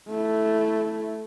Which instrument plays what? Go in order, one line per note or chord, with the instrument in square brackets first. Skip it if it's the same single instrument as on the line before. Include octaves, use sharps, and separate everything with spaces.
[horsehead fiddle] A3 E4